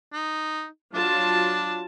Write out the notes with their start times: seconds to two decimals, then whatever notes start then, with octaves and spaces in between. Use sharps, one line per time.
0.13 D#4
0.94 F#3 D4 F4 A5